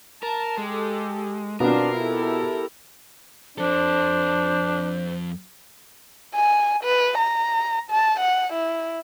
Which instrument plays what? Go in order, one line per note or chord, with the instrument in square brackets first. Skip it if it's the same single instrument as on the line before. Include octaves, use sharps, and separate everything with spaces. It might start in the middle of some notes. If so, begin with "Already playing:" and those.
[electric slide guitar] A#4 [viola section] A5
[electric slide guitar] G#3 [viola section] G4 A4
[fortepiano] B2 B3 [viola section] C4 D4 F4 [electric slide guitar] A#4
[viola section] E4 G4 A4
[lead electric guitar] F2 A4 [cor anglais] D4 [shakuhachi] C5
[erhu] G#5
B4
A#5
A5
F#5
E4